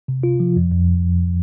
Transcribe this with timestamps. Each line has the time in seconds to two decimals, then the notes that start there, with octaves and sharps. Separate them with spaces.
0.08 C3
0.23 F4
0.40 F3
0.56 F2
0.71 F2